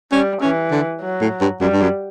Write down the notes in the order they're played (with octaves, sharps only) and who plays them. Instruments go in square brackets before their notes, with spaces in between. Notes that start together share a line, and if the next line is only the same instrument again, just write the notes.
[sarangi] G3 [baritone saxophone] C#4
[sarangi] E3 [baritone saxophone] C#4
[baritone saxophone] D3
[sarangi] F#3
[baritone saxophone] A2
G2
[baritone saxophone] F#2 [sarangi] G3
[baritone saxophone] G2
F#2